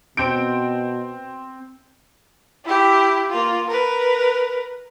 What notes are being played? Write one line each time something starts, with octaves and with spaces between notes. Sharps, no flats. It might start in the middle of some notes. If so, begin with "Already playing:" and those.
B2 C4 G6 D7
E4 G4
A#3 F4
A#4 B4